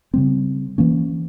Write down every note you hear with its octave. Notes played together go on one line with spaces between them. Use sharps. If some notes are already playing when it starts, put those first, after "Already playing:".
C#3 G3 C4
E3 A#3 C#4